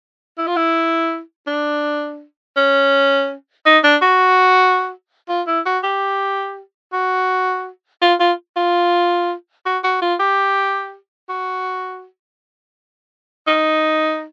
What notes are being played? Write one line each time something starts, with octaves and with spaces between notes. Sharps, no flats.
E4
F4
E4
D4
C#4
D#4
D4
F#4
F4
E4
F#4
G4
F#4
F4
F4
F4
F#4
F#4
F4
G4
F#4
D#4